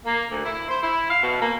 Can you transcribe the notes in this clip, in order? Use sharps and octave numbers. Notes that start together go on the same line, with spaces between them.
A#3
D2
E4
C5
E4
F5
B2
A#3